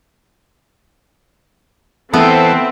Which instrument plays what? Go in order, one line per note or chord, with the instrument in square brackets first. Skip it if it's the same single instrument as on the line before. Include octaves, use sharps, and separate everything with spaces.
[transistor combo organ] E3 [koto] B3 [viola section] C4 E5 [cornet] A4